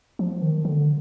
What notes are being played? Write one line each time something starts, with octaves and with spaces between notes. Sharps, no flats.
F3
D#3
D3